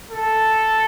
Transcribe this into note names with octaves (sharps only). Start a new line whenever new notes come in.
A4